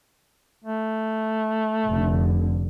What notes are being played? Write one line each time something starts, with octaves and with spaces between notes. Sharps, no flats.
A3
F1 D3